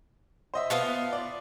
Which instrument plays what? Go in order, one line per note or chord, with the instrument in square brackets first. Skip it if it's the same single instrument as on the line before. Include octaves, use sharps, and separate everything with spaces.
[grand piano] C5 D#5 E5
[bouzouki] B3 F4 A5
[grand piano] D5